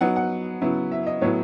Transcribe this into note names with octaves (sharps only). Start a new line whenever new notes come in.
F#3 B3 D#4 F#5
F#5
C#3 F#3 B3 E4
E5
D#5
A2 F#3 B3 E4 C#5